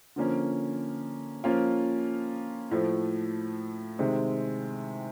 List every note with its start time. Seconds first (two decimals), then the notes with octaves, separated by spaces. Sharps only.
0.16 D3 F3 A#3 C#4
1.44 F3 A#3 C#4 F4
2.71 A2 F3 A3
3.99 C3 D#3 G#3 C4